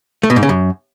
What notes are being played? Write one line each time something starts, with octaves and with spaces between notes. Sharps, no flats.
A3
B2
G#2
C#3
F#2